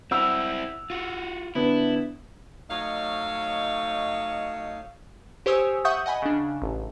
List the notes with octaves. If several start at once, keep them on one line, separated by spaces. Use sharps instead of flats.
C4 E4 F#5 E6 F7
F4 F#4
D3 B3 D4 E4
F#3 A3 D#4 C#5 D#5 F5
G4 C5 C#5 G#5 D#6 E6
E5 F#5 C#6 D#6 G6
D#5 F#5 G#5 B5
C#3 D4
A1